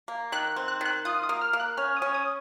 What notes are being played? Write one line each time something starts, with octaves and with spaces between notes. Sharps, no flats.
A#3
D#3 F#6
C4
F#6
D#3 F#6
F4 D#6
D#6
A#3
F6
A#3
F#6
C#4 F6
D#6
C#4
D#6